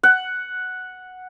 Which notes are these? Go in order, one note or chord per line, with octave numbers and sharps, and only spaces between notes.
F#5